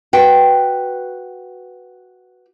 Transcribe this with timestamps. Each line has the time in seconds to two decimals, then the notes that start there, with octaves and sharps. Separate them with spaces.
0.13 F#4 B4 G5